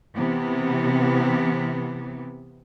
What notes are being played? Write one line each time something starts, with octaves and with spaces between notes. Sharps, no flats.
C3 E3 B3